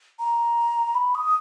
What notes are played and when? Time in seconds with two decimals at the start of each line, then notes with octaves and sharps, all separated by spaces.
0.19 A#5
0.95 B5
1.15 D#6